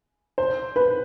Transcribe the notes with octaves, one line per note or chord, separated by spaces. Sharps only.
C5
B4